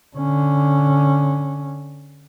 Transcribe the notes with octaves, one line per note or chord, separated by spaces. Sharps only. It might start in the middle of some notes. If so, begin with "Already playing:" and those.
D3 C#4